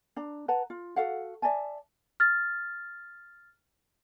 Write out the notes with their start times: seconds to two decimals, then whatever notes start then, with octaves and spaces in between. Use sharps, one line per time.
0.16 D4 A#5
0.48 B4 F#5 A5 A#5
0.70 F4
0.96 F#4 A4 F5 F#5
1.42 D5 E5 G#5 A5
2.20 F6 A6